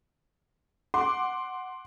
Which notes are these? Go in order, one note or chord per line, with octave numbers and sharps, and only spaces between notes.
F#5 C6 D6